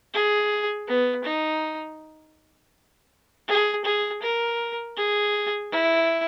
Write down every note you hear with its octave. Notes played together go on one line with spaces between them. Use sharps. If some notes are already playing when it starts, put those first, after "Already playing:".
G#4
B3
D#4
G#4
G#4
A#4
G#4
E4